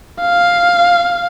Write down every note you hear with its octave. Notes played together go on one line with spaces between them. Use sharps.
F5